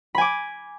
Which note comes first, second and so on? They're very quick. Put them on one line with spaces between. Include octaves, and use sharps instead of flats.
B5 G#5 D6